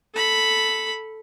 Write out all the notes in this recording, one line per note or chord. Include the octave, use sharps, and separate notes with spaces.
A4 B5